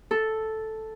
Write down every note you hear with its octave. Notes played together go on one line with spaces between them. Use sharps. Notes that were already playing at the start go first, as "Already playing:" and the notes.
A4